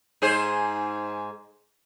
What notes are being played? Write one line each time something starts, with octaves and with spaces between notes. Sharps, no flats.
G#2 G#4 C5